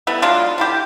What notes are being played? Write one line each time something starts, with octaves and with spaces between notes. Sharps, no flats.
G3 A3 B3 E4
F#3 G#3 D4 F4
D3 E4 G4